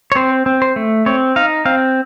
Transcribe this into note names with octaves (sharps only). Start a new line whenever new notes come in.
C#5
C4 C5
C4
C5
A3
C4 C#5
D#4 F5
C4 F5